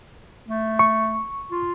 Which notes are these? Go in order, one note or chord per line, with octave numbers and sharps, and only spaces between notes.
A3
C#6
F4